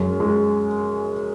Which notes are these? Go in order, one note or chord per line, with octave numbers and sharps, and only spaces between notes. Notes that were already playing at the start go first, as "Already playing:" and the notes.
Already playing: F#2 G#3
G#3